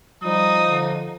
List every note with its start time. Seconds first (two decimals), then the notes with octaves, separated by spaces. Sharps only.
0.24 F3 G3 D#4 D#6
0.66 D3